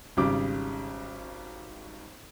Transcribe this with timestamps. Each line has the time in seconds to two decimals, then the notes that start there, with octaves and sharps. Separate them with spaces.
0.17 G#1 C#3 G3 D6